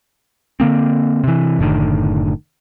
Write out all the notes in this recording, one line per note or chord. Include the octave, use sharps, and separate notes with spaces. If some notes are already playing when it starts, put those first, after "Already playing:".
D3 A#3 C4
C3 E3
F#1 A2 D3 D#3